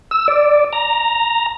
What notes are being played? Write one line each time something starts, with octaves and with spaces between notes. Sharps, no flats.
E6
D5
A#5